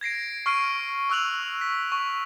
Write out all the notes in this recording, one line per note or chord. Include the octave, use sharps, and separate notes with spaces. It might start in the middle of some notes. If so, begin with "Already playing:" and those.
G#6 A#6 C7 D7
C#6 F6 C7 D7 D#7
C#6 E6 F#6 F7 F#7
B6
C#6